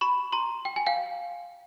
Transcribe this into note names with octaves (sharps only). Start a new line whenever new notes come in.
B5 C#6
A#5 C6
G5
G#5
F5 G5